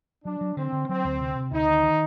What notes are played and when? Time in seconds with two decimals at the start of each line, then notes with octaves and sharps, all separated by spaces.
0.25 F#3 D4
0.41 F#3
0.57 D3 C4
0.72 D3
0.89 F#3 C4
1.04 D2
1.20 C3
1.35 C3
1.51 D2 D#4
1.67 D#3
1.83 D#3